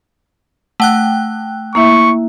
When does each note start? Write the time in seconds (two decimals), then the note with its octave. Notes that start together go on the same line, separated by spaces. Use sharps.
0.80 A3 F#5 G5 F#6
1.75 A#3 E4 E5 C#6